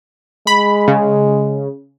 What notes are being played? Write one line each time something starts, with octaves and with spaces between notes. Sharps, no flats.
G#3 B5
C#3